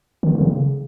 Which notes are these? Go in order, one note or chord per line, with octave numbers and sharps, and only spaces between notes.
D#3
D3
C#3